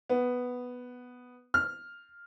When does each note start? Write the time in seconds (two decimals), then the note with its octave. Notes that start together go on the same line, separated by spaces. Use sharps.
0.09 B3
1.54 F6